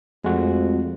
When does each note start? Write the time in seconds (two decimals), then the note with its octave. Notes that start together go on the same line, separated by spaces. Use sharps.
0.24 F2 G#3 A3 F#4